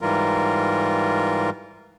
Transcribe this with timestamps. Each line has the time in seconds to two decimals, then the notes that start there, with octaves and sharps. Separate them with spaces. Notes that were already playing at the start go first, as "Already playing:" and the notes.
0.01 G#2 E3 G3 F4 A#4